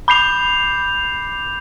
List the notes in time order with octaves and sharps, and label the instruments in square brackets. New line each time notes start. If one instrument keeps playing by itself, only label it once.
[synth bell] B5 [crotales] D6 G6 C7 F7